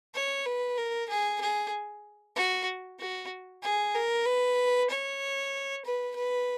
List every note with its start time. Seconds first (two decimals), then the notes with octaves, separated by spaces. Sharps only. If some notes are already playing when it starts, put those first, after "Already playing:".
0.14 C#5
0.45 B4
0.77 A#4
1.09 G#4
1.40 G#4
2.36 F#4
2.99 F#4
3.63 G#4
3.94 A#4
4.25 B4
4.89 C#5
5.85 B4
6.16 B4